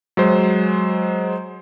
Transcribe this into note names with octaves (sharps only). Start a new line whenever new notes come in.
F#3 G#3 C5